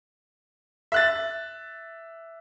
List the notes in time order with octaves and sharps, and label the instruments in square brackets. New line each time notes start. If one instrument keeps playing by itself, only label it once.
[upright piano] E5 F#6 A6